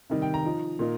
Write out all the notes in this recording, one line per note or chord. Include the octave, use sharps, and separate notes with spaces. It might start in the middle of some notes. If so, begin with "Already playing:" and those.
C3 D#3 G3 D#4
G5
A#5
F3 D#4
A#2 A#3 D#4